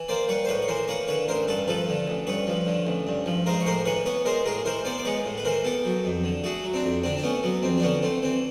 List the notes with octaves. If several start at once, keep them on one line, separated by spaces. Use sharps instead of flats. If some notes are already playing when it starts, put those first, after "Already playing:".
Already playing: E3
A#3 C5 D5
G3 B4 C#5
C5
A2 B4 C#5
C#5
E3 A#4 C5
A#3 B4 C#5
D3 B4 C#5
A1 A#4 C5
G2 A4 B4
F3 A4 B4
D3
A1
G2 B4 C#5
F3
D3
A1
G2
F3
G#3 A#4 C5
C#5
A2 A#4 C5
E3 B4 C#5
B3 B4 C#5
G#3 A#4 C5
A2 G#4 A#4
E3 A#4 C5
B3 C5 D5
D5
G#3 B4 C#5
A2
B4
E3 A#4 C5
B3 G4 A4
F#3
F2
D3
A3 F#4 G#4
F#3
C4 D4
F2
D3 C4 D4
D4
A3 B3 C#4
F#3 B3
F2 C4
D4
D3 B3 C#4
A3 C4
E3 C4